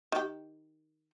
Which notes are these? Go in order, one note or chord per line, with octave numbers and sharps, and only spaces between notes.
D#3 G4